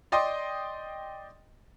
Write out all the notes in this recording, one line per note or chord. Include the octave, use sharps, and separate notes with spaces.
D5 D#5 G5 C6 D#6